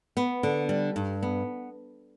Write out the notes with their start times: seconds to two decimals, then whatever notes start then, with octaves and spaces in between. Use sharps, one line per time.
0.17 B3
0.43 D3
0.69 G3
0.96 G2
1.23 B3